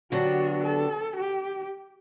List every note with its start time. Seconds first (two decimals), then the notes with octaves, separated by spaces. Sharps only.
0.11 D3 F#3 B3 D4 F#4 G4
0.64 A4
1.17 G4